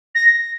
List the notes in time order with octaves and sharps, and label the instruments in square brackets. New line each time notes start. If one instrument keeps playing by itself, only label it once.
[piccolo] A#6